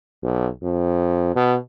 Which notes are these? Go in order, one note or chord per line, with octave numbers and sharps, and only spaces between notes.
B1
F2
B2